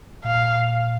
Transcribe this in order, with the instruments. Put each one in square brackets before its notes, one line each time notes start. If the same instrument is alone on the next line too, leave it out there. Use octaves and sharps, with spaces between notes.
[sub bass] A#2 [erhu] F5